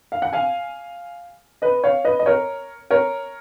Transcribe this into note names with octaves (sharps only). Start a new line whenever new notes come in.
F5
F#5
F5 G#5
B4 D#5
C#5 F5
B4 D#5
D#5
A#4 C#5
A#4 C#5